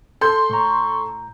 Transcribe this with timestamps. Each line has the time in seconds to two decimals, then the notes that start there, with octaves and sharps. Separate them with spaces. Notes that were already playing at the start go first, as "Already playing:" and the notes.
0.21 A4 C6 G6
0.50 A2 A#5 C#6